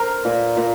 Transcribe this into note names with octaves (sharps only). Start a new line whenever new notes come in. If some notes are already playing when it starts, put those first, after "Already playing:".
Already playing: A#4 C5
A#2
A#2